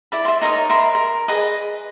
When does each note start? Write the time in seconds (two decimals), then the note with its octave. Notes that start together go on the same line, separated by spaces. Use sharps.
0.12 E4 D5 B5
0.25 E5 C6
0.41 D#4 A#4 C#5 D#6
0.69 A#4 E5 B5 C6
0.95 A#4
1.28 G#4 B4 D#5